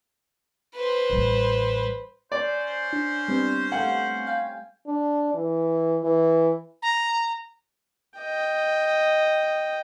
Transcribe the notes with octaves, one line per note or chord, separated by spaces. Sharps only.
B4 C5
A1 G3
C#4 C5 D5
D4
G3 B3 C4
A3 F5 F#5 G#5
F5 G5 G#5
D4
E3
E3
A#5
D#5 G5